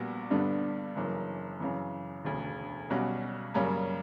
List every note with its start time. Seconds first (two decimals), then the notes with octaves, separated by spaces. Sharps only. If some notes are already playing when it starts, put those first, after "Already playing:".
Already playing: A#1 A#2 G3 B3 F#4
0.30 G2 D3 G3 B3 D4
0.96 F#1 F#2 E3 A#3
1.60 F#2 C#3 E3
2.25 E1 D2 C#3
2.90 B1 B2 G3 C#4 F#4
3.54 F#2 C#3 G3 A#3 C#4